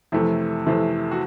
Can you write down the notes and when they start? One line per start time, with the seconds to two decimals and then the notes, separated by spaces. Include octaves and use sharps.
0.12 F2 C3 E3 A3 E4
0.67 F2 C3 E3 A3
1.12 F#4